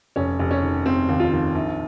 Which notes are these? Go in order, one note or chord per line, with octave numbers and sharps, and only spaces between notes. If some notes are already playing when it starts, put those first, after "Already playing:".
F1 C#4
F1
C#4
D#3
F1 C4
D#2
F4
D#3
A#1